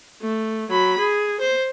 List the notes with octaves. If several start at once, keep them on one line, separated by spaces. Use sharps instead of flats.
A3
F#3 B5
G#4
C5